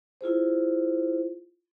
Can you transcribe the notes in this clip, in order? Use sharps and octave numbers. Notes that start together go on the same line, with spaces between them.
E4 F4 G#4 C5